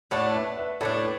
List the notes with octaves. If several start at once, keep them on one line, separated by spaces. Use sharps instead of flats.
A2 A3 D4 D5 F#5
B4 E5
B4 E5
A2 A3 D4 A4 D5
B4